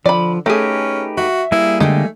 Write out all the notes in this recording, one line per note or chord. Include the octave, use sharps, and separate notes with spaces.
D3 F3 D5 B5
A3 C#4 D#4 G4 G#4 B4
F#4 E5
G3 A#3 E4 G#4
D3 G#3 A3 G4